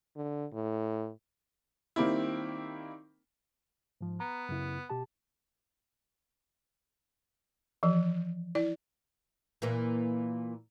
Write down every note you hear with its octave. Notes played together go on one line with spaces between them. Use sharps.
D3
A2
D#3 G3 A#3 C4 E4
G#2 F3
B3 A#5
F#2 C#3 E4
B2 G4 A5
E3 F3
E4 D5
A#2 E3 A#3